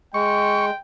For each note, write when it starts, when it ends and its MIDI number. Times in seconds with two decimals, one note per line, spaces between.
0.14 0.71 56
0.14 0.80 79
0.14 0.66 85